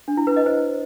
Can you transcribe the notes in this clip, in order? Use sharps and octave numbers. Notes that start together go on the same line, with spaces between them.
D4
E4
B4
D#5
C5